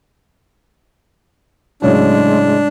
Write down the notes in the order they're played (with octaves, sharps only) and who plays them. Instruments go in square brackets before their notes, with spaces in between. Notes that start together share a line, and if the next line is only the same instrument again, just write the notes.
[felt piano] A2 C#3 F#3 [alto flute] G#3 [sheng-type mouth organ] D4